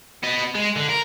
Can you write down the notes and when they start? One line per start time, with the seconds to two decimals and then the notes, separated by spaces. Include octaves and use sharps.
0.23 B3 D#5
0.55 G#3
0.76 D3
0.89 A#4